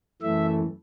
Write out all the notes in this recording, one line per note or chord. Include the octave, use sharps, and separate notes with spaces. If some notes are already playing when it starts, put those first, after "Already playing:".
F#2 E3 A3 E5